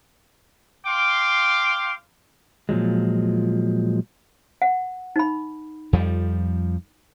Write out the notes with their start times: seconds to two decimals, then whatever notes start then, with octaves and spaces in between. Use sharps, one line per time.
0.86 F5 G5 C6 D6
2.69 A#2 F3 F#3 G#3
4.62 F#5
5.16 D#4 B5
5.93 F2 F3 G3